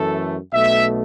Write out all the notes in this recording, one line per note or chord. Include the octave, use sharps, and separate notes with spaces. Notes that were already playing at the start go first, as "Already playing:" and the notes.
Already playing: F#2 E3 A3 A4
B1 B2 A3 E5